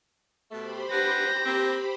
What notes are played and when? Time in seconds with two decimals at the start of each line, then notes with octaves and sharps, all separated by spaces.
0.51 B2 A3 G4 C5 B5
0.91 D4 B4 F#5 G6 A#6
1.46 A#3 C4